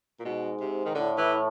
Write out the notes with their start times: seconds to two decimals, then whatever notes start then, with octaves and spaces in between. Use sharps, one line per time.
0.20 A#2
0.25 G#2 B2
0.60 C3
0.85 D#3
0.95 A2 D3
1.18 E3